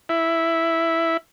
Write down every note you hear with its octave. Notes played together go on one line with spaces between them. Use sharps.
E4